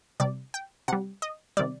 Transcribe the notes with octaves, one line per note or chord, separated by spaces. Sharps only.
C3 G3 D5
G5
C3 G3 F#5
D#5
C3 D#3 G3 D5